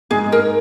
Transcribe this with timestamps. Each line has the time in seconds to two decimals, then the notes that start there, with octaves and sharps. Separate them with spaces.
0.10 G#2 G#3 D#4 G#4
0.32 A#4